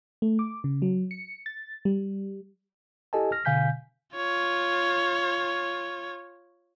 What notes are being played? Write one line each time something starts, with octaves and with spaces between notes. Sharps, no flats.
A3
D6
C#3
F#3
C#7
A6
G3
E4 G4 A4 D#5 G#5 A5
F6 A#6
B2 D3 F5 G#5 G6 B6
F4 C#5